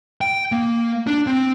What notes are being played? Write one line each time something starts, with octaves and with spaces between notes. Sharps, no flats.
G5
A#3
D4
C4